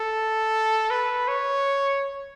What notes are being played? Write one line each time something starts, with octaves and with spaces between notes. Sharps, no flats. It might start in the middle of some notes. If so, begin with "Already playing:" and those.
Already playing: A4
B4
C#5